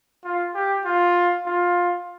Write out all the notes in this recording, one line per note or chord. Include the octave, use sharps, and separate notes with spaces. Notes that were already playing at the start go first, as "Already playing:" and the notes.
F4
G4
F4
F4